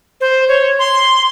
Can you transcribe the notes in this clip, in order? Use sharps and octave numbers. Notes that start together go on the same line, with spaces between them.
C5
C#5
C6